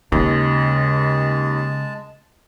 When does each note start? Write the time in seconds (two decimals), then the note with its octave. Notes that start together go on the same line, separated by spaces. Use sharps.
0.12 D#2 C#3 G#3 A5